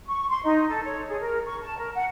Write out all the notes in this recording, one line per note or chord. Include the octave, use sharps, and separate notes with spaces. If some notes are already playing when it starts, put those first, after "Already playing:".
C#6
C6
D#4
A4
C#5
G#4
A#4
C#6
A5
A#4
F#5